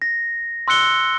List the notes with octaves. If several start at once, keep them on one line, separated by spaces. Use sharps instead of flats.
A#6
C6 E6 F#6 C#7 G7